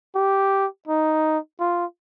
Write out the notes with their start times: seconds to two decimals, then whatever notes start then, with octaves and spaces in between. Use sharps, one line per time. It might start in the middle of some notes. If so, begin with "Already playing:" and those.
0.16 G4
0.88 D#4
1.60 F4